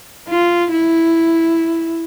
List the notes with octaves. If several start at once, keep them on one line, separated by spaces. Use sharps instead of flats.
F4
E4